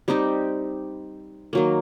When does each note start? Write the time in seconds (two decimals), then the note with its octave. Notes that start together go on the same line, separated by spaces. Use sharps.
0.08 G3 C4 D#4 G4
1.53 D#3 F#3 A#3